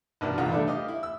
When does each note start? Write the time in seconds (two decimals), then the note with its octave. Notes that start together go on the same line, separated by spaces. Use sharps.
0.21 A1 B2 D4 A#4
0.38 A#1 E2 D3 D#3 F4 F#5
0.50 D3 G3 A3 D4 E4 A4
0.67 G4 D#5 F5
0.88 E4
1.03 E6